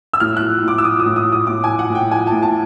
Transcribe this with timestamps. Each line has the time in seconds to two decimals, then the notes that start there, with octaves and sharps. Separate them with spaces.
0.13 E6
0.20 A2 F6
0.37 F#6
0.42 F3
0.63 A2
0.68 D6
0.78 E6
0.84 F3 D#6
0.99 D#6
1.06 A2
1.16 D#6
1.27 F3
1.32 D#6
1.47 A2 D6
1.64 F3 G#5
1.79 F#5
1.90 A2
1.95 G5
2.11 F3 G#5
2.27 A5
2.32 A2
2.42 A5